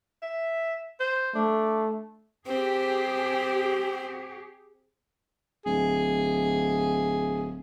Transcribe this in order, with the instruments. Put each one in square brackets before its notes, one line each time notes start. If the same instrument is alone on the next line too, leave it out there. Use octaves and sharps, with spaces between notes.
[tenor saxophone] E5
C5
[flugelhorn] A3 [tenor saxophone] D4
[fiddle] C4 [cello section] G4 G#4
[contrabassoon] D1 [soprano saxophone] G#4